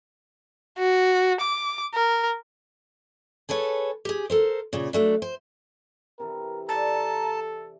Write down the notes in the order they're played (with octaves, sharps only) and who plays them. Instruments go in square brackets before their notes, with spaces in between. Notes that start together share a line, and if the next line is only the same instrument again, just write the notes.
[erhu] F#4
D6
A#4
[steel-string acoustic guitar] G#4 A4 B4 C#5
G4 G#4
A4 A#4 C5
A#2 C#3
F#3 A3 D4
C5
[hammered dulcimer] C3 E3 A4 [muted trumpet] A#4
[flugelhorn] A4 [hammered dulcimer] D5 [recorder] A5 [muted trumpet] A#5